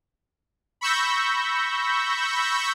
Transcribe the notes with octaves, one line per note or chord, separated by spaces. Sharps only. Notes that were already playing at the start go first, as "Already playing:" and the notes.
B5 C#6 E6 G6 A#6